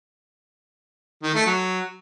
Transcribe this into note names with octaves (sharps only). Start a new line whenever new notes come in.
D#3
A3
F#3